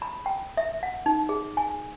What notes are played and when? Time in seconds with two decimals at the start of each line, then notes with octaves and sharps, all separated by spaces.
0.02 B5
0.26 G5
0.57 E5
0.83 F#5
1.06 D#4
1.29 G#4
1.57 G#5